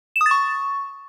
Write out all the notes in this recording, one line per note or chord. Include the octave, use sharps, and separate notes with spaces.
E7
D#6
A6
C#6